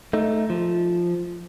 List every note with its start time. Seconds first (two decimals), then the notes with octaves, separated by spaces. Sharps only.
0.13 A3 D#4
0.50 F3